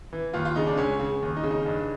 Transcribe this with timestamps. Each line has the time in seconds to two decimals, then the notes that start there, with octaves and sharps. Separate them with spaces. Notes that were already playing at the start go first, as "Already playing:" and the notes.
0.13 E3
0.34 D#2 F4
0.45 F4
0.56 C#3 D#4
0.67 D4
0.78 C#2 C#4
1.00 C#3
1.22 D#2
1.36 D#4
1.44 C#3
1.51 D#4
1.66 G2